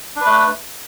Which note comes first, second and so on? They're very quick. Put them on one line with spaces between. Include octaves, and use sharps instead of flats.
D4 B4 A3